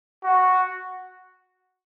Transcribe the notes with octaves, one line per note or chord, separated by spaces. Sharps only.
F#4